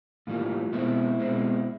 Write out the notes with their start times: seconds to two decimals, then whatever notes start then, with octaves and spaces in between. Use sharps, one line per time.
0.27 A2 E3 G3 A#3 F4
0.72 B2 G#3 C4 E4
1.19 B2 G#3 C4